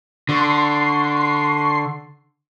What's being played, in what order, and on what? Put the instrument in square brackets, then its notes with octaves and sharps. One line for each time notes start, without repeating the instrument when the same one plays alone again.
[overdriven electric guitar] D3 [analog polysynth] C6 C#6 C7